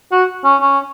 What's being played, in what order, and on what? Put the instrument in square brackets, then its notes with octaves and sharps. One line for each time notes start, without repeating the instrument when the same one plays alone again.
[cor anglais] F#4
C#4
C#4